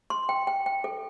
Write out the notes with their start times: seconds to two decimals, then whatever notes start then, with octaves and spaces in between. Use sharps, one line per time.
0.10 C6
0.29 G5
0.47 G5
0.66 G5
0.84 A4